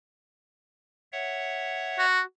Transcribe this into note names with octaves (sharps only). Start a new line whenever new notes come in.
C#5 E5 F#5
F#4